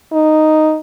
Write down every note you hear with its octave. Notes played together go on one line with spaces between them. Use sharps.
D#4